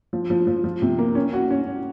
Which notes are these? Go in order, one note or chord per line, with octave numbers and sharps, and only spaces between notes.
F3
F3
F3
F3
C3
A#3
C#4
F#4
C#4